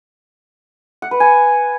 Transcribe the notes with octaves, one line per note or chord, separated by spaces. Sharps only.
F#5
B4
G#5